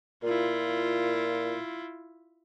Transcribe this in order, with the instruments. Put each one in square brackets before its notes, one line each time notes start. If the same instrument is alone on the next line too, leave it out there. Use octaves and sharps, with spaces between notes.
[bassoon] A#2 [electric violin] E4 F4